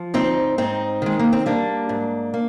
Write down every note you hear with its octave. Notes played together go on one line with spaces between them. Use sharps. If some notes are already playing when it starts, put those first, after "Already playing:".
Already playing: F3
D2 C4 D#4
G#2 C4 D#4
D#3 G#3
A#3
C4
G3 A#3 D4
G#2
A#3